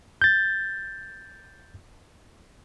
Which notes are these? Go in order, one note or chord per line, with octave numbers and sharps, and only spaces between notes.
G6 A6